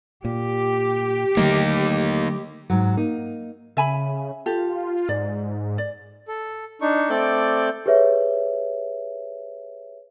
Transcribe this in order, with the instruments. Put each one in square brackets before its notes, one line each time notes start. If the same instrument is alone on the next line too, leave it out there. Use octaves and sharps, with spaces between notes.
[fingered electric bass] A#2 [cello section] G4
[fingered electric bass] D3 F#3 A3 [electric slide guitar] A#3 D#4
[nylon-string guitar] G#2 F#3
A#3 D#4
[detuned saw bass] C#3 [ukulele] E5 G#5 B5
[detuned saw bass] F4 [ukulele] G4 A4
[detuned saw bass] G#2 [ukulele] D5
[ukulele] D5
[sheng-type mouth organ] A4
D4 D#4 C#6
A3 C4 A4 D5 D6 G6
[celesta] G4 G#4 B4 C#5 E5